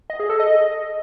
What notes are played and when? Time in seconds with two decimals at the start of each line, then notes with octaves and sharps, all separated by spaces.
0.10 D#5
0.20 G#4
0.30 A4
0.39 D#5